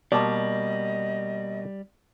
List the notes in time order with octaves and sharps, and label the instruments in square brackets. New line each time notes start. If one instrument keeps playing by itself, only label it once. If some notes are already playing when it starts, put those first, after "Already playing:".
[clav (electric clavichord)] B2 A#3 [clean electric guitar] G3 [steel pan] D5 A5 [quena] D#5